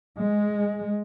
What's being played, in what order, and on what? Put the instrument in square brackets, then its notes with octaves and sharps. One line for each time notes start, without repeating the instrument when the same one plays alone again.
[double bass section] G#3